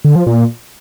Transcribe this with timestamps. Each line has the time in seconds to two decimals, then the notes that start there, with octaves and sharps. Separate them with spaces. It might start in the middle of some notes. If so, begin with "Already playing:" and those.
0.05 D3
0.16 F3
0.27 A#2